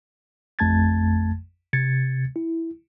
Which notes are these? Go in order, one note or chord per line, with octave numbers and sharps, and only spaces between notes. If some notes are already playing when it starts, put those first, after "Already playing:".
A1 F2 A3 A5 G#6 A6
C3 G#6 A6 C#7
E4